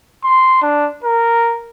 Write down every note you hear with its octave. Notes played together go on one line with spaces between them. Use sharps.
C6
D4
A#4